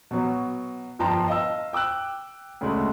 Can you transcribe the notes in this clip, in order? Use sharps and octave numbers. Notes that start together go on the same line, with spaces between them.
B2 F#3
G1 F3 G5 A5 A#5 C6
D#5 F5 E6
G5 D6 E6 F#6
D2 C#3 G#3 A3